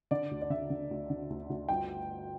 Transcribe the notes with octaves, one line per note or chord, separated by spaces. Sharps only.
D3 D5
D2
D5
D3 E5
D3
D2
D3
D2
D2
G1 G5